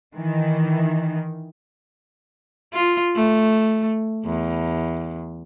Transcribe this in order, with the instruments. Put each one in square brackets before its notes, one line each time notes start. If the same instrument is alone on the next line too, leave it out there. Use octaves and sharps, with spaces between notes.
[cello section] D#3 E3
[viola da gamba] F4
A3
E2